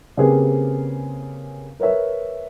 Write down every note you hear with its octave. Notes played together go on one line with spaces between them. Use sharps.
C#3 A#3 C4 G4 G#4 B4
A#4 B4 C#5 E5